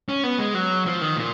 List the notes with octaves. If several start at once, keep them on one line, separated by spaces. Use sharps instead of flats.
C#4
B3
G#3
F#3
F3
D#3
A#2